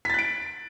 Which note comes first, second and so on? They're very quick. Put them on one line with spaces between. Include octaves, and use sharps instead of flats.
B6 A6 F#6 D7